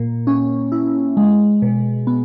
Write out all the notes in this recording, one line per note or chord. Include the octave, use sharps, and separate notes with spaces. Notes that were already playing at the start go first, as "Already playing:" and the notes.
Already playing: A#2 A#3
C#4
E4
G#3
B2
B3